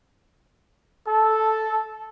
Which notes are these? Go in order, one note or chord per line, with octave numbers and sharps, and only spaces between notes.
A4